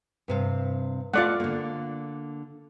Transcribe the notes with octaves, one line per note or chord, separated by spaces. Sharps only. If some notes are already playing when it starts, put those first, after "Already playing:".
G2 C3 F5
A3 F4 D5 D#5 F#5
D3 A#3